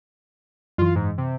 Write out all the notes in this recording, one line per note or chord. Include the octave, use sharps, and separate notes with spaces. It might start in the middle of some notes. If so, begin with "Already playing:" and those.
F#2 E3 F4
G#2
C3